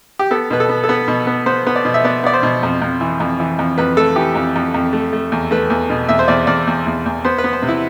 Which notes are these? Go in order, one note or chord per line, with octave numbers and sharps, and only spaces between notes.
G4
B3 A4
B2 B4
A4
B3
A4
B3 B4
B2
B3
B3 C5
B3
D5
B2
E5
B3 D5
B3 D5
C5
B2
F2
F2
E3
F2
E3
F2
F2 B4
A3 A4
E3 G4
F2
F2
F2
A3
A3
E2
A3 B4
E2
B2
E2 E5
C5
E2 D5
E2 D5
E2
E2
E2
B3 C5
B4
B3
C5
C3
E4